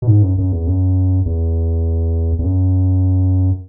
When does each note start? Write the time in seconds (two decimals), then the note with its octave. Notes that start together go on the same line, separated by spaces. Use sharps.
0.02 B2
0.07 G#2
0.22 F#2
0.38 F#2
0.52 E2
0.67 F#2
1.26 E2
2.39 E2
2.44 F#2